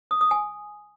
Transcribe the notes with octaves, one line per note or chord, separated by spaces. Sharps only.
D#6
D#6
G#5